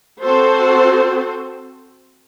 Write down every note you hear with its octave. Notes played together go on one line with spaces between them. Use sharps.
C4 F#4 A4 C5